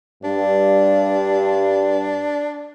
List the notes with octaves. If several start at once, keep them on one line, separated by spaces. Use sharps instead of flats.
G2 D4